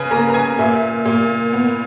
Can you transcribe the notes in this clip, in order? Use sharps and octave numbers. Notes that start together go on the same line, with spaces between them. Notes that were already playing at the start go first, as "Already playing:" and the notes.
Already playing: C#3 B4 G#5
A#3 A#5
A#5
G#5
A#2 E5
A#2
B3